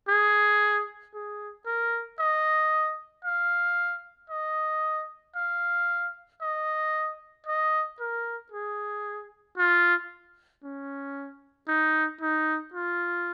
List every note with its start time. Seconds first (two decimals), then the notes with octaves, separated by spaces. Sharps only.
0.09 G#4
1.14 G#4
1.66 A#4
2.19 D#5
3.25 F5
4.30 D#5
5.36 F5
6.42 D#5
7.46 D#5
8.00 A#4
8.52 G#4
9.58 F4
10.64 C#4
11.68 D#4
12.21 D#4
12.74 F4